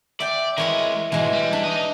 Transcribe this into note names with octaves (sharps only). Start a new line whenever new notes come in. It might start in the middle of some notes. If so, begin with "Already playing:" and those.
D5 E5 G5
E3 G#3 A#4 C#5 B5
G#2 B2 E3 G#3
G3
D4
D#4 D#5